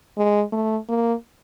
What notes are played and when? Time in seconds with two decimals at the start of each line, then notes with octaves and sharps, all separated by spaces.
0.18 G#3
0.52 A3
0.89 A#3